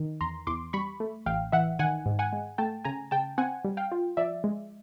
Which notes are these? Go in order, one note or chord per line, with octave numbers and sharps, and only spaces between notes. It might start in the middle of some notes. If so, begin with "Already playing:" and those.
Already playing: D#3
E2 A#5 C6
E2 C6 D6
G3 B5 C#6
A3
A1 F5 G5
E3 E5 F#5
D#3 F#5 G#5
G#2
F#5 G#5
G#3
A3 G5 A5
C#3 G#5 A#5
C#3 G5 A5
C4 F#5 G#5
G3
F5 G5
F4
F3 D5 E5
G#3